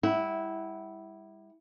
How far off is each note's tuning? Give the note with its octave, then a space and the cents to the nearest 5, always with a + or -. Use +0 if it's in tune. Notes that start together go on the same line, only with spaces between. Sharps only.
G3 +35 E4 -10 F#5 +30